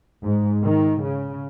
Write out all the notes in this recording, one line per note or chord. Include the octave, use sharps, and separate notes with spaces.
G#2
D#3
C#3